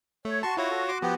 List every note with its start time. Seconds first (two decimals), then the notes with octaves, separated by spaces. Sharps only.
0.25 A3 C#5
0.43 F#4 A5 C6 C#6
0.57 E4 F4 C#5 A#6
0.71 A4
0.88 C6 D6
1.02 F3 B3 G4